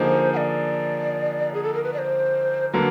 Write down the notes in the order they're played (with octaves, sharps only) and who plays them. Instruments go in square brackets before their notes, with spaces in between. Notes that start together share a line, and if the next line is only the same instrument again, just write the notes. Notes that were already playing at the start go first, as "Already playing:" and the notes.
Already playing: [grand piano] D3 F3 A#3 D#4 G#4 [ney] C5
[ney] F#5
D5
G#4
A4
A#4
B4
D5
C5
[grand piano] D3 F#3 A#3 [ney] B4